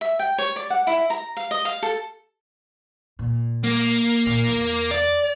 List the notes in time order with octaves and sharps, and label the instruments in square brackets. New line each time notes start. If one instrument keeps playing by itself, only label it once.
[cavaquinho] E5
G5
C#5
D5
F#5
E4
A#5
F5
D#5
F5
A4
[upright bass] A#2
[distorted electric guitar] A#3
[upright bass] A#2
E2
[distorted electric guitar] D5